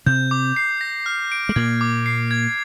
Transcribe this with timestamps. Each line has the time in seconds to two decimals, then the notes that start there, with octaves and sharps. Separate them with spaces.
0.06 C3 C4 G6
0.31 D6
0.56 C7
0.81 A#6
1.06 F6
1.32 D7
1.49 G#3
1.56 A#2 A#3 G#6
1.81 D6
2.06 C7
2.31 G#6